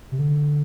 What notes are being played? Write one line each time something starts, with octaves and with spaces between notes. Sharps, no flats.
C3
D3